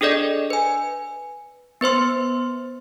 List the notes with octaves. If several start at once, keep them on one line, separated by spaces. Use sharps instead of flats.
D4 G#4 A4 D5 D#5
B4 G#5
B3 B4 C5 C6